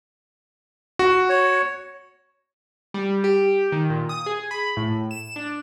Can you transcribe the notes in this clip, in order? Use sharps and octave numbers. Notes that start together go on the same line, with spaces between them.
F#4
C#5
G3
G4
D#3
A#2
D#6
G#4
B5
A2
E7
D4